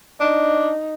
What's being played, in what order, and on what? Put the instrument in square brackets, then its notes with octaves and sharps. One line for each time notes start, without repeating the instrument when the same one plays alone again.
[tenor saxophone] D4 [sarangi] D#4